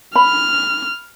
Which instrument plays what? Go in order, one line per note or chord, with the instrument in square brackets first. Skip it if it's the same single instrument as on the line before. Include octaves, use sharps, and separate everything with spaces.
[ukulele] B5 [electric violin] F6